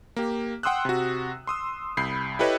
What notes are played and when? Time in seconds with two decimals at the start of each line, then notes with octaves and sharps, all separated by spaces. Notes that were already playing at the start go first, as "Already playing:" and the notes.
0.16 A#3 G4
0.63 F#5 G5 C6 D#6 E6 F#6
0.85 C3 F#4
1.47 C6 D#6 E6
1.97 C2 B5 G6 C7
2.39 E4 G4 A4 B4 C#5 D#5